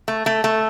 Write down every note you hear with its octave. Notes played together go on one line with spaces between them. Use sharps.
A3
A3
A3